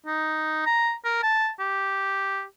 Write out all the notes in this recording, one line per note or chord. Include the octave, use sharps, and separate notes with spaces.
D#4
A#5
A#4
A5
G4